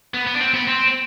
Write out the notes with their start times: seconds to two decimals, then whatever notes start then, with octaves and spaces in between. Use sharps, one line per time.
0.14 B3
0.27 B3
0.35 D4
0.41 C4
0.54 B3
0.67 C4